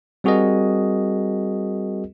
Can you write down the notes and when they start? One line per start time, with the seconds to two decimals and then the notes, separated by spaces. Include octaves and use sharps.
0.24 G3 C4 F#4 G#4 A#4 D#5